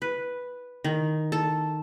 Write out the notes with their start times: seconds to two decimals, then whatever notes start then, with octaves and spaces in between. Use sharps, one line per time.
0.02 B4
0.84 D#3
1.32 A4